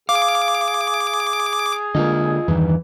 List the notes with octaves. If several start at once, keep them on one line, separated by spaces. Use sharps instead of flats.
G#4 F5 D6
D3 G#3 A#3 F4 D#5
E2 G2 D#3 E3